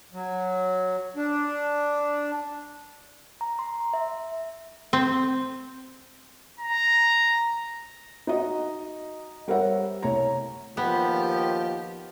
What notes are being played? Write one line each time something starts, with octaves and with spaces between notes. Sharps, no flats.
F#3
D4
A#5
C6
E5
C4
A#5
D#4 F#4 D#5
G3 A#4 C5 C#5 E5 F#5
C2 A3 C#5 A#5
D#2 F3 B3 G4